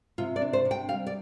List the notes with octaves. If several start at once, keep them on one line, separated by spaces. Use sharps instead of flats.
C3 F4
D5
D4
C5
C3
G5
G3 F5
D5